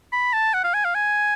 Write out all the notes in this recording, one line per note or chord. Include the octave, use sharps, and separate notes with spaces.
B5
A5
F#5
F5
G#5
F5
G#5